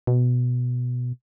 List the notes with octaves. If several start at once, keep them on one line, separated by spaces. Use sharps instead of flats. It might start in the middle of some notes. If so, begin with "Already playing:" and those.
B2